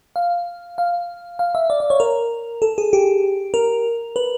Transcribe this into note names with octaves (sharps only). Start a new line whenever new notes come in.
F5
F5
F5
E5
D5
D5
C#5
A#4
A4
G#4
G4
A#4
B4